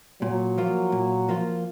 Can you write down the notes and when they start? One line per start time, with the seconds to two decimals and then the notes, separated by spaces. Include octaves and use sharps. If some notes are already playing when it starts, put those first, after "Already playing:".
0.22 A#2 F#3
0.58 F3 A#3 F4
0.92 A#2
1.29 F3 A#3 F4